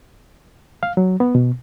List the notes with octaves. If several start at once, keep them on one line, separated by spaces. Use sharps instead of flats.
F5
F#3
B3
B2